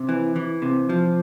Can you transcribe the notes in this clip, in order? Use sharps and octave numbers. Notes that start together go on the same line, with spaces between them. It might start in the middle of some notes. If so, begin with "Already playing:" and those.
Already playing: C3
E3
E3
C3
F3